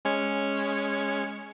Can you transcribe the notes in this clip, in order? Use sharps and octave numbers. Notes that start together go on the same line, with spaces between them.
G#3 C#4 C#5